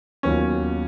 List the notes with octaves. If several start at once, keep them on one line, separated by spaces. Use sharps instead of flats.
D#2 D#3 F#3 B3 C#4 F4